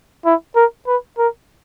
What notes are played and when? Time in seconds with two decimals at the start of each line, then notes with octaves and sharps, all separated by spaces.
0.25 E4
0.56 A#4
0.87 B4
1.18 A#4